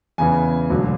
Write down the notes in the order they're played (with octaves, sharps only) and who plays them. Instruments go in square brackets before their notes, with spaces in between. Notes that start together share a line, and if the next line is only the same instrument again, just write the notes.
[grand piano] E2 C#3 E3 G#5
E1 D2 D3 F#3